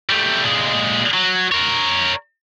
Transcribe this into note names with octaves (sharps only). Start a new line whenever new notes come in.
G3 A3
A#2 G#3
F#3
A#4 C#5